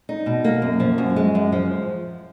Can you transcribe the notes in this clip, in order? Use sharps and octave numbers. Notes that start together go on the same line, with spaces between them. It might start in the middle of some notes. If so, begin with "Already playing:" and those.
D#4
B2
A#3
F#2
F3
F#2
G#3
F#2
F3